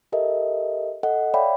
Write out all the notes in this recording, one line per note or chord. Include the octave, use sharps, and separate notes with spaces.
G4 A4 A#4 D#5 E5
A4 D#5 F#5
C#5 D5 E5 F5 G5 B5